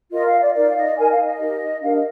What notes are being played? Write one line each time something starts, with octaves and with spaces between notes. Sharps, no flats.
F4 A#4 D#5
F5
D5
D#4 A#4 D5
F5
D#5
D#4 A#4 G#5
F5
D#5
D#4 G4 A#4
D4 G4 A#4 F5
D#5